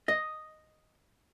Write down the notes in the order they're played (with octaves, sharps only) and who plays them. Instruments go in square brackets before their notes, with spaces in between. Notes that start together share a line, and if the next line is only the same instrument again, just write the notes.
[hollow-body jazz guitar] D#5